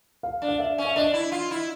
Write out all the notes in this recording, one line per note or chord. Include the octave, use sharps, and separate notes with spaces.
F5
D4
F5
E5
C#4
E5
D4 D#5
E4
F4
E4